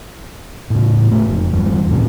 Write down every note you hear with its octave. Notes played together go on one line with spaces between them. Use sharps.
A2 C#3
F#1 A3
F1
E2 G2
C2 A2 C3